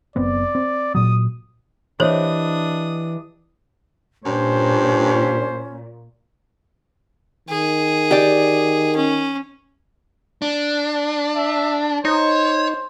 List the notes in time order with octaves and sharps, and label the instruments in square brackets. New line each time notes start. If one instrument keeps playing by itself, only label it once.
[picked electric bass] F#1 B3 C4 [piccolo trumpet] D5
[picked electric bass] C4
[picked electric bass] A#2 F#3 [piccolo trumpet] D#6
[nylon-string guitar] E3 G4 D#5 [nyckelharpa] D4 D#6 [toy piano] C5 C#5
[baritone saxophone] G2 [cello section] A#2 [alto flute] C#4 [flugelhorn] C5
[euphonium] D#3 [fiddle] G#4
[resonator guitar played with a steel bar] G4 D5
[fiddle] C#4
[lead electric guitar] D4
[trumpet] E5
[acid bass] D#4 [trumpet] C5 [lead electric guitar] C#5